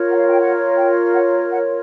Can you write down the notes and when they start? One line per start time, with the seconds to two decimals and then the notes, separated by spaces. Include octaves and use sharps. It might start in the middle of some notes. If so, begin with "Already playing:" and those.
Already playing: F4 A#4 C#5
0.10 F#5
0.16 F5
0.29 G5
0.40 F#5
0.77 G5
1.14 F#5
1.51 F#5